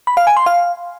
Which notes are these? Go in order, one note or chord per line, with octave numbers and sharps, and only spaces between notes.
B5
F5
G#5
C6
F5